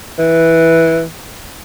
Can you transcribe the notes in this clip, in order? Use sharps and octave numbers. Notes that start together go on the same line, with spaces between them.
E3